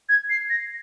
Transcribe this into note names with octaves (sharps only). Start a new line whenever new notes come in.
G#6
C7
A#6